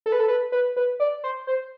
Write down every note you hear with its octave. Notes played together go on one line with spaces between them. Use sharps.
A4
B4
A4
B4
B4
B4
D5
C5
C5